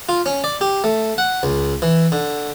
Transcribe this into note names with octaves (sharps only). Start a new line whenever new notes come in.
F4
C#4
D5
G4
A3
F#5
C#2
E3
D3